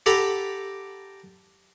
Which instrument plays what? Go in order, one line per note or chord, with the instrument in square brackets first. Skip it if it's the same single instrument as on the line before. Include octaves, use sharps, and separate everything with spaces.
[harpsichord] G4 A4 F#5 A#5 B5